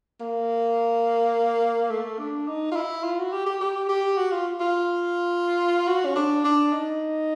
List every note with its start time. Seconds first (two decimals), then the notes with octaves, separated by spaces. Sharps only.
0.20 A#3
1.90 A3
2.19 D4
2.48 D#4
2.71 F4
2.76 E4
3.04 F4
3.19 F#4
3.32 G4
3.46 G4
3.61 G4
3.89 G4
4.17 F#4
4.32 F4
4.60 F4
5.87 F#4
6.05 C#4
6.16 D4
6.44 D4
6.72 D#4